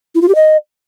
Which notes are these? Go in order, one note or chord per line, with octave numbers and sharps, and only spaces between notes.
E4
F4
G4
D#5